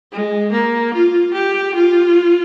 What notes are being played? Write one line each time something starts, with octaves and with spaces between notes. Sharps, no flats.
G#3
A#3
F4
G4
F4